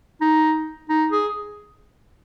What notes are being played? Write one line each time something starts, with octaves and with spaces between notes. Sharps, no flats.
D#4
D#4
G#4